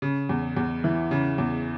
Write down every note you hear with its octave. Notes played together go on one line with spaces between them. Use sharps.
C#3
E2
E2
E3
C#3
E2